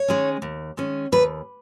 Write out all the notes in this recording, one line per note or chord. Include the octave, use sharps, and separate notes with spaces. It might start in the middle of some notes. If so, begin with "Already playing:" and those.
Already playing: C#5
D#3 G#3 C#4
D#2
D#3 G#3 C#4
D#2 B4